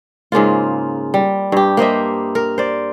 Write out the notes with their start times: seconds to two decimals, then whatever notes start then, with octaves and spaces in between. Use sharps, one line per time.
0.32 G#2 C#3 A#3 F4
1.14 G3
1.52 G2 G4
1.77 A#3 C5 D#5 E5
2.35 A#4
2.58 C5 D5